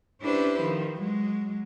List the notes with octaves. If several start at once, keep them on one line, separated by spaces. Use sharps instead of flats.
C#4 D4 E4 G4 B4 C5
D#3 F3
F#3 G#3